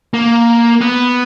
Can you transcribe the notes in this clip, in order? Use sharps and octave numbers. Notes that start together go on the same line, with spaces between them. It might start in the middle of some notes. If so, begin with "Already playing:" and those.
A#3
B3